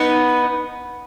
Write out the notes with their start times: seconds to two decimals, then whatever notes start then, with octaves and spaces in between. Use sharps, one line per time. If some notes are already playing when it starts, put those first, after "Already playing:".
Already playing: B3 D#4